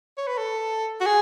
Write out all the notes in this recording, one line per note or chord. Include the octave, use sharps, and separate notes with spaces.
C#5
B4
A4
F#4
G#4